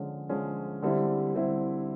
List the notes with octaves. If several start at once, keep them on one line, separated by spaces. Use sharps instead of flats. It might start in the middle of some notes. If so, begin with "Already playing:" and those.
Already playing: D3 F3 G#3 C#4
D3 F3 G#3 C#4
D3 G3 C4 E4
D3 G3 C4 E4